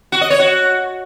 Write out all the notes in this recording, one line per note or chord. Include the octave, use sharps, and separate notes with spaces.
F#4
D#5
C#5
F#4